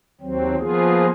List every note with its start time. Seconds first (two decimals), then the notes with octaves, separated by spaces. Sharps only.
0.21 D#2 F#3 C4
0.59 F3 A#3 B3 F4 G#4